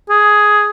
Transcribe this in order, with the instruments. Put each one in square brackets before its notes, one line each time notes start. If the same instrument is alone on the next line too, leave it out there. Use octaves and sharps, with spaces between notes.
[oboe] G#4